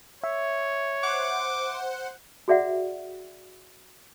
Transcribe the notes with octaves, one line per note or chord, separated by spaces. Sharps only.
C#5 E5
C5 F#5 D6
F#4 G#4 D5 E5 F#5